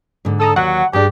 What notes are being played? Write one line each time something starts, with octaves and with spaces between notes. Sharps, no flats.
G#2 D3
A4 A#5 D#6 E6
D#2 F#3 F#5
G2 D4 G4 G#4